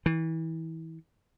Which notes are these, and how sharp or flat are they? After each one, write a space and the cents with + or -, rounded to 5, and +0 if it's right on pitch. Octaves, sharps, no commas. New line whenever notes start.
E3 -30